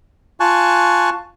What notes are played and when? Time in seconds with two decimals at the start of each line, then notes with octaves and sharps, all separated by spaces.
0.40 F4 G#5 A5 C#6 F#6